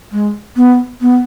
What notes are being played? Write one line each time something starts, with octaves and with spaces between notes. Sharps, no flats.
G#3
B3
B3